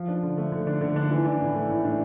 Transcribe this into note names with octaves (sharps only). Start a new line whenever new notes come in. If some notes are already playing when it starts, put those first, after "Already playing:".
Already playing: F3
D4
D3
A3
D3
D4
D3
D4
E3
D4
A2
A3
A2
D4